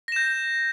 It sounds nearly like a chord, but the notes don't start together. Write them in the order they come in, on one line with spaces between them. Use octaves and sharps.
A#6 E7 G6